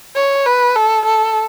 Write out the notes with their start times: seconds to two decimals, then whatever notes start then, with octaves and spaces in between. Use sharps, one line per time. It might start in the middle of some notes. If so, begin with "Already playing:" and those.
0.16 C#5
0.46 B4
0.76 A4
1.05 A4